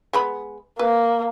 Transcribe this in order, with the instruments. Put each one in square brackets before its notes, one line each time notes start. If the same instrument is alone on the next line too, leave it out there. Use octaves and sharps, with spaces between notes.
[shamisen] G#3 B3 B5
[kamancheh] A#3 [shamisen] B4